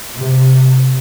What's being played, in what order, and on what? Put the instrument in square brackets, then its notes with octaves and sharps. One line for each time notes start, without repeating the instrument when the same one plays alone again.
[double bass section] C3